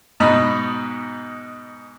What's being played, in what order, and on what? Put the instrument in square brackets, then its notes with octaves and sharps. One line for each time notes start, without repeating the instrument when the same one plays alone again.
[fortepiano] G#2 B2 D#4 D#5 B5